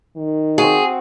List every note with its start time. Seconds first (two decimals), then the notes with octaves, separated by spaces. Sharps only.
0.17 D#3
0.58 C4 F#4 G#4